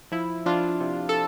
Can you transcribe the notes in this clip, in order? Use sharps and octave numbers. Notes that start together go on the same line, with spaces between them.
F3 E4
F3 D4 F4
C3
A4